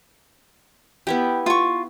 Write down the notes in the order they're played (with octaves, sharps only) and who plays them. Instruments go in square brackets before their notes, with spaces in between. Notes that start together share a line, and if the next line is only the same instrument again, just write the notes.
[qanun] B3 E4 G4 [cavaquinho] G5
[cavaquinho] F4 C#6